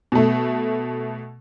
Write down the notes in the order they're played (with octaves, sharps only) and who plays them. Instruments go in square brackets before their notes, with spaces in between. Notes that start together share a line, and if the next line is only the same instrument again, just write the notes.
[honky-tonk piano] B2 A3